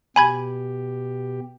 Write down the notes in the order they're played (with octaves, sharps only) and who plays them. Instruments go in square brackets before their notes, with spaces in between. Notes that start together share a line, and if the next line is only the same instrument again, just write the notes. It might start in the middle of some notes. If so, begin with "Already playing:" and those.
[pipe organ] B2 G4 [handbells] G#5 B5 G#6